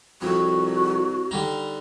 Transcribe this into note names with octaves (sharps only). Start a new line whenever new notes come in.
C2 F2 F#4
D3 G3 D#4